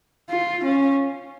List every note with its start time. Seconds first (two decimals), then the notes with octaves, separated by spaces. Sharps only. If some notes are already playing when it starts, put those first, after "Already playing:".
0.29 F4
0.63 C#4